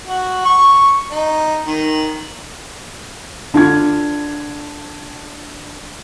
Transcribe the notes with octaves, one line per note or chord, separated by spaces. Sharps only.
F#4
C#6
D#4
D#3
D3 D4 F4 G#6